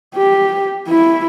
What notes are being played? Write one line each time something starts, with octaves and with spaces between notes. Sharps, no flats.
G4
E4